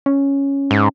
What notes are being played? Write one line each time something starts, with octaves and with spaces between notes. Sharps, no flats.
C#4
G#2